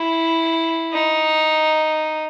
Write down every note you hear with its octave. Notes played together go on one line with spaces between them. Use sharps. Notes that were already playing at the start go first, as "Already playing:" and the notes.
Already playing: E4
D#4